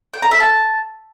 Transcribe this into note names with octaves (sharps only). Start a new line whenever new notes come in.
G5
A#5
E5
A5